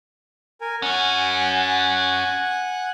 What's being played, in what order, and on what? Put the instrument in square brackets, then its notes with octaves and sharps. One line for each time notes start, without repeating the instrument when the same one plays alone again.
[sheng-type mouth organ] A#4 G#5
[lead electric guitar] C#4 F#4 [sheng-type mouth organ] F#5 G#5